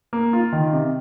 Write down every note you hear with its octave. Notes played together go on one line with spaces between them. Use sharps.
A#3
F4
D#3
C3